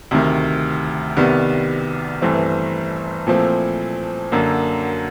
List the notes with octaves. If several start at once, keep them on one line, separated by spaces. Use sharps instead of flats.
D2 C3 D#3
C2 C3 D#3 G3 B3
G1 G2 E3 A3 C4
A#2 F3 A3 C4 E4
F#2 D3 F#3 A#3